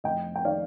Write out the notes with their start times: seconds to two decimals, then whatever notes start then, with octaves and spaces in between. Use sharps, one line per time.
0.04 F1 D#5 G5
0.36 G5
0.45 D#3 D5 F5